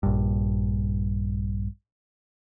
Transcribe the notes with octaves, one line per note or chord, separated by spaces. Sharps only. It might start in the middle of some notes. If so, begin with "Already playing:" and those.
A#1 G2